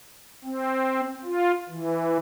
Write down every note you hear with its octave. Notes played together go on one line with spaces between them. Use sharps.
C4
F4
E3